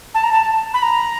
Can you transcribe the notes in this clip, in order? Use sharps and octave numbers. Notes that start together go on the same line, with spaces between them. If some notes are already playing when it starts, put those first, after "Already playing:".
A5
A#5
A5
B5
A#5